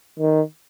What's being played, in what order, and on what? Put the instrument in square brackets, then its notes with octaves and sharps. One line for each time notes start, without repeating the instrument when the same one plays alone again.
[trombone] D#3